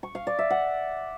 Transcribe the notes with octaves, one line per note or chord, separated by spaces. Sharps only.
C#6
F5
D5
E5
F#5